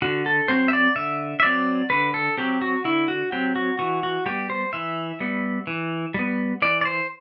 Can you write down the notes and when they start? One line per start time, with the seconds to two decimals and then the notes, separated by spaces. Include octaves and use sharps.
0.02 D3 F#4
0.26 A4
0.48 F#3 C4 C5
0.68 E5
0.73 D5
0.96 D3 E5
1.40 E5
1.43 F#3 C4 D5
1.90 D3 B4
2.14 A4
2.37 F#3 C4 G4
2.61 F#4
2.84 D3 E4
3.08 F#4
3.32 F#3 C4 G4
3.56 F#4
3.79 E3 F#4
4.03 F#4
4.26 G3 B3 G4
4.50 C5
4.73 E3 E5
5.20 G3 B3
5.67 E3
6.14 G3 B3
6.62 E3 D5
6.81 D5
6.85 C5